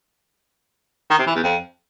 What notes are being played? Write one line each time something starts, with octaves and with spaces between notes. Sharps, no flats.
D#3
C3
E3
E2
F2